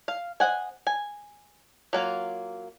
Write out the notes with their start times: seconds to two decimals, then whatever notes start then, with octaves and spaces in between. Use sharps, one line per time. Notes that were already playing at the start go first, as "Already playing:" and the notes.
0.08 F5
0.40 C5 D#5 F#5 G#5
0.87 G#5
1.93 F#3 A#3 F4